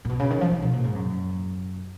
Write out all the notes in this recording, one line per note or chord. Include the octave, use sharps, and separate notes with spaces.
A#2
B2
C#3
D#3
F3
D#3
B2
A#2
G#2
F#2